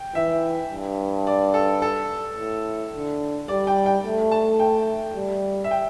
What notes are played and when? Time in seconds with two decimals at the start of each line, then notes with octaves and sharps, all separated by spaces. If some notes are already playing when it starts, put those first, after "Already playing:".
Already playing: G5
0.15 E3 E5
0.70 G2
1.27 D5
1.54 A4
1.82 A4
2.37 A2
2.93 D3
3.48 G3 D5
3.67 G5
3.86 G5
4.04 A3
4.31 A5
4.59 G5
5.16 G3
5.64 E5
5.71 G5